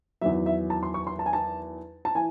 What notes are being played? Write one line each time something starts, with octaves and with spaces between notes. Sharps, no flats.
E2 D#3 F#3 E5
E5
A5
C6
C#6
C6
A5
G#5
A5
A5
E3 G#5